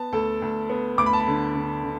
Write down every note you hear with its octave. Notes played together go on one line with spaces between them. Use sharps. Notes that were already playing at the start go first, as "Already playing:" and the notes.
Already playing: B3 A5
D2 A4
D2
B3
D2 D6
B5
A5
B5
D3
D3
D3